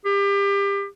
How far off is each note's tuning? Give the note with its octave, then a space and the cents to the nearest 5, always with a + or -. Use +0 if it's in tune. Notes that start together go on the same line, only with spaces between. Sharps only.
G4 +30